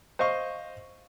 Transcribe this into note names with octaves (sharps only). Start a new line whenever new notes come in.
C5 D#5 F5 C#6